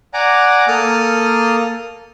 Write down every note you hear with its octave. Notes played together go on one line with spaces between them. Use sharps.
D5 F#5 G#5 A#5 D6
A#3 A4 D#6 F6